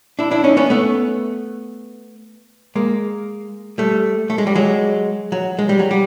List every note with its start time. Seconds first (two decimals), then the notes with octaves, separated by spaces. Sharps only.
0.19 D4 E4
0.31 D4 E4
0.44 C#4 D#4
0.57 B3 C#4
0.70 A3 B3
2.75 G#3 A#3
3.78 G3 A3
4.30 A3
4.38 G#3
4.47 G3
4.55 F#3 G#3
5.32 F#3
5.59 G#3
5.69 G3
5.79 F#3
5.91 G3